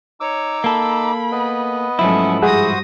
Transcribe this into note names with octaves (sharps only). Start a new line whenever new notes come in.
D#4 C#5 D6 E6
A#3 A4 B5
B3 B4 D#5
G#2 F3 F#3 A3 C#4 E4
G2 F#4 G#4 C5 F#5 D#6 A#6